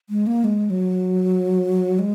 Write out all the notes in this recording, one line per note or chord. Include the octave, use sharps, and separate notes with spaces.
G#3
A#3
G#3
F#3
G#3